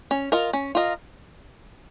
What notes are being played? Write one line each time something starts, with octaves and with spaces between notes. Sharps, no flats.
C#4
F4 A#4 D#5
C#4
F4 A#4 D#5